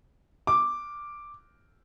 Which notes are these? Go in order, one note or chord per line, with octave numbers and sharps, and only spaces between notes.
D6